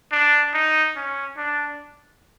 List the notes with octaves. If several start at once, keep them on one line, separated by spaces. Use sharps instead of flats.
D4
D#4
C#4
D4